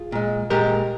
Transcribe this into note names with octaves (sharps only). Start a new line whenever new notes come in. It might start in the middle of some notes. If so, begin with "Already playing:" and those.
Already playing: F4 G#4
A#2 G#3
A#2 G#3 G4 A#4